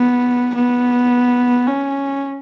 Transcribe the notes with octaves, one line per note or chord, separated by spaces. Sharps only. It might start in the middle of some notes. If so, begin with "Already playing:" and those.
Already playing: B3
B3
C#4